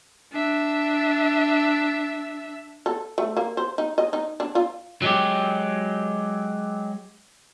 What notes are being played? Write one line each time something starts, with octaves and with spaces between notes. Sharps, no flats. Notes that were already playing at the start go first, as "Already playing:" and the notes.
D4 E5
A4
A3
A#3
C5
D#4
D#5
D#4
D4
F4
F#3 G#3 G4